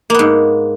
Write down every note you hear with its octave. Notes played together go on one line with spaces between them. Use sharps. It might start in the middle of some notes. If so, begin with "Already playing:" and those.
G#2 A#3 B3